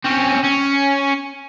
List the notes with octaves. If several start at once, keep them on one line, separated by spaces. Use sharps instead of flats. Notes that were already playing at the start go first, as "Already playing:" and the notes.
C4 C#4
C#4